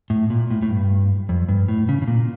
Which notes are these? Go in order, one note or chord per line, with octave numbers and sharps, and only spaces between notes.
A2
A#2
A2
A2
G2
F2
G2
A2
C#3
C#3
A#2